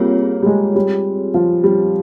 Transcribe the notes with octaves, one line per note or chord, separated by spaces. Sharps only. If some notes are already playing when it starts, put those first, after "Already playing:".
Already playing: G3 A#3 C4 F4 G#4 C#5
G3
G#3
G3
F3
G3